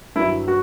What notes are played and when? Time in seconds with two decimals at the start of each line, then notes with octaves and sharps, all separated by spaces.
0.16 G2 F#3 E4
0.48 F#4